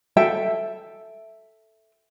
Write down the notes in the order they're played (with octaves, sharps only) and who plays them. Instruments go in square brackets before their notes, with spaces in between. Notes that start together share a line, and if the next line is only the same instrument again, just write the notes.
[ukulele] A4 E5 G5